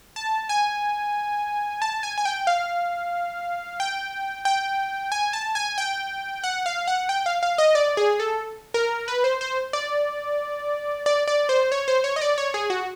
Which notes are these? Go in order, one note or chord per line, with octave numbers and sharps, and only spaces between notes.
A5
G#5
A5
G#5
G#5
G5
F5
G5
G5
G#5
A5
G#5
G5
F#5
F5
F#5
G5
F5
F5
D#5
D5
G#4
A4
A#4
B4
C5
C5
D5
D5
D5
C5
C#5
C5
C#5
D#5
D5
C#5
G#4
F#4